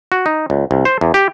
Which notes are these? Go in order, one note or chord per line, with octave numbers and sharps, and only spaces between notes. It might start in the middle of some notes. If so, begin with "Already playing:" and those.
F#4
D#4
C#2
C2
C5
E2
G4